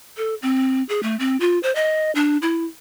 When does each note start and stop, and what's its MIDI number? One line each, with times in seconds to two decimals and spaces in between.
0.17 0.35 69
0.42 0.83 60
0.89 1.03 68
1.03 1.16 57
1.19 1.37 60
1.40 1.59 65
1.63 1.74 72
1.75 2.11 75
2.15 2.37 62
2.42 2.65 64